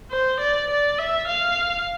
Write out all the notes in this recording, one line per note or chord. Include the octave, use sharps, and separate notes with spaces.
C5
D5
D5
E5
F5